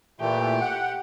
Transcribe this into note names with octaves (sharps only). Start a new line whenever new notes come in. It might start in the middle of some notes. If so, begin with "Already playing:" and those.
A#2 E3 A3 G4
F#5